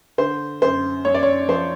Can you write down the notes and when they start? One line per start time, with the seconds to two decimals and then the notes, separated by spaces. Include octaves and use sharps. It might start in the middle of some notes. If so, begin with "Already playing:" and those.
0.18 D3 C5
0.62 F#2 C5
1.05 F#2 C#5
1.14 D5
1.23 C#5
1.48 F3 C5